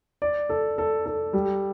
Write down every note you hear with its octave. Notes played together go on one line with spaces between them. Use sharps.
D5
A4
A4
A4
G3